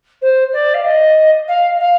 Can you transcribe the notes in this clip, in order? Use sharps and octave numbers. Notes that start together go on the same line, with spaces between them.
C5
D5
F5
D#5
F5
F5